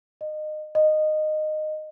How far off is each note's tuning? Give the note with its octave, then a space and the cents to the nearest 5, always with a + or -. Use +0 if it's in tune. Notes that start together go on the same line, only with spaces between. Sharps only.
D#5 -25
D#5 -15